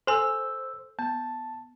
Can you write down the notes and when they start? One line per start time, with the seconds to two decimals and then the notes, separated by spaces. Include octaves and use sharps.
0.07 A4 C5 G#5 E6
0.99 B3 A5